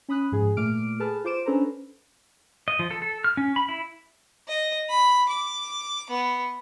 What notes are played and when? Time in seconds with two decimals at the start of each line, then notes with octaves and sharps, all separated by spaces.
0.09 C#4 B5 D#6 F#6
0.32 G#2 F3 G#4
0.57 A#2 A3 D6 F6 D7
1.00 G#4 A4 B4 A5 F6
1.24 F4 C5 D6 D7 E7
1.46 C#4 D4 A4 B4 C5 A#5
2.68 D#5
2.79 F3
2.91 A4
3.02 A4
3.24 F6
3.37 C#4
3.56 B5
3.69 E4
4.48 D#5
4.89 B5
5.29 D6
6.10 B3